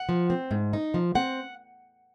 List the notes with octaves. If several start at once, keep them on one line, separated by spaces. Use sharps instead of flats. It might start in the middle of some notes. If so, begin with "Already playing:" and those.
Already playing: F#5
F3
C4
G#2
D#4
F3
C4 F#5